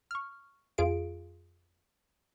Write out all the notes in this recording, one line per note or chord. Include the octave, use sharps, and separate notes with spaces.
C#6 F6
F2 F4 G#4 F5 D7